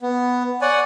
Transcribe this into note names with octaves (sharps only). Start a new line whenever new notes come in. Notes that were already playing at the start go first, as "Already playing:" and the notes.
B3
C#5 D5 F#5 G#5